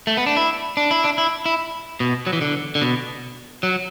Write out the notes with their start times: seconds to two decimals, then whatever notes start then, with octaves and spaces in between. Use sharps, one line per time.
0.07 A3
0.17 B3
0.26 D4
0.37 E4
0.77 D4
0.91 E4
1.04 D4
1.18 E4
1.46 E4
2.00 B2
2.27 F#3
2.33 E3
2.41 D3
2.75 D3
2.82 B2
3.63 F#3